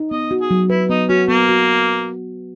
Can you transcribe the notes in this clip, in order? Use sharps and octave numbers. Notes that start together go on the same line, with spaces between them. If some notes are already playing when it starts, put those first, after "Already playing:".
Already playing: D#4
B3 D#5
F#4
G#4
F#3
E4 B4
B3 D#4
C#4 F#4
A#3 B3
F#4